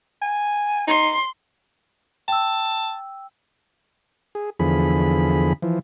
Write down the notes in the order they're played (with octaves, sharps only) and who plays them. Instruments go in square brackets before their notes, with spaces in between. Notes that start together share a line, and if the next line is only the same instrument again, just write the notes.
[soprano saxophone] G#5
[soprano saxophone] D#4 [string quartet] C6
[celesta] G5 E6 [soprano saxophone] A5
[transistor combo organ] G#4
E2 D3 F3 G#4 B5
E3 F3